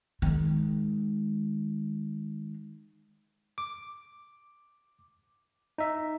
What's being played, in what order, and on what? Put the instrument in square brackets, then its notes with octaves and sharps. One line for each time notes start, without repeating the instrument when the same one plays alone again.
[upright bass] D#3 G#3
[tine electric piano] D6
D#4 E5